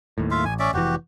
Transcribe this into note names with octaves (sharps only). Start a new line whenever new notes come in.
D#2 A2
F4 E5 F5
A1 G#5
C#4 D5 E5
F1 E3 F#4 G4